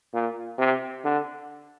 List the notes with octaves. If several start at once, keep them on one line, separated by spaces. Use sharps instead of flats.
A#2
C3
D3